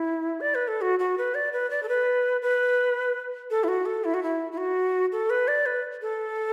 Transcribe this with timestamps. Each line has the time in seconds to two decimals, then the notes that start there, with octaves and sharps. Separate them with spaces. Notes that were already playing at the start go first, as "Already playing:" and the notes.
Already playing: E4
0.41 D5
0.55 B4
0.68 A4
0.81 F#4
0.99 F#4
1.18 B4
1.35 D5
1.53 B4
1.70 D5
1.83 A4
1.89 B4
2.42 B4
3.51 A4
3.64 E4
3.68 F#4
3.86 A4
4.04 E4
4.14 F#4
4.23 E4
4.52 E4
4.57 F#4
5.12 A4
5.30 B4
5.48 D5
5.66 B4
6.02 A4